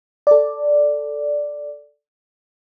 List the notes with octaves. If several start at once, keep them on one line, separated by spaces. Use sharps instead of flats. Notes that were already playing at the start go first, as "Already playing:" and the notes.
A4 D5